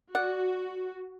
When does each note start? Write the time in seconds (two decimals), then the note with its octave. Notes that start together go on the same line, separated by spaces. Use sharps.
0.15 F#4 D5 F#5